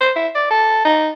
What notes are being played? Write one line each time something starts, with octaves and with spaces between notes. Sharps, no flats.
C5
E4
D5
A4
D#4